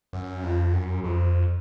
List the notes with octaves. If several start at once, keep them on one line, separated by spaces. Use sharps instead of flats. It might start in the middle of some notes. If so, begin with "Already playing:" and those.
F#2
F2
F#2
F2